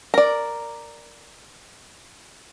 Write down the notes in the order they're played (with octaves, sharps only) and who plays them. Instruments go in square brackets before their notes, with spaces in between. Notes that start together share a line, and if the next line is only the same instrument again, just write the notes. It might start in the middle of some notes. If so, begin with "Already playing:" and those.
[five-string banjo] A#4 D5